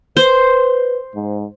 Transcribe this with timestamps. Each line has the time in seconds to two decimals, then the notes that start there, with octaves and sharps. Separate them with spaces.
0.17 B4 C5
1.15 G#2